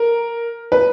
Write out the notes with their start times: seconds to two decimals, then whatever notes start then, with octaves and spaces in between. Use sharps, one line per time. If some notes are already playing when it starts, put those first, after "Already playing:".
Already playing: A#4
0.72 B4